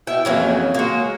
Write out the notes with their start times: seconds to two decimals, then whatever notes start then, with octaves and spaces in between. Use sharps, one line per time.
0.07 B2 E4 G5
0.25 F2 C#3 E3 F#3 A#3 C#4
0.74 G#3 A#3 F#4